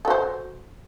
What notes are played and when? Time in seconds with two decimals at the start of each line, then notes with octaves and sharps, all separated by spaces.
0.05 A4
0.08 F#4
0.10 C5